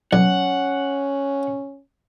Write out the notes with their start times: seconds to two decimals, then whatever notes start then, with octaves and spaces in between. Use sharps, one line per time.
0.13 B1 C#4 F#5